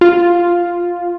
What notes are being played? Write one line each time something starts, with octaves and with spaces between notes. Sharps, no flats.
F4